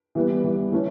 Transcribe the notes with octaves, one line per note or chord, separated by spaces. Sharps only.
E3 G3 B3
E3 G3 B3
E3 A3 C#4